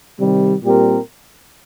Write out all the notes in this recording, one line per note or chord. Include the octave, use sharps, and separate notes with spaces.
C3 D#3 G3
A#2 G3 C4 G4 A#4